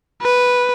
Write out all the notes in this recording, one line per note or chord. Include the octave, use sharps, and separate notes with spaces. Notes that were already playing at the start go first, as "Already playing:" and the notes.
B4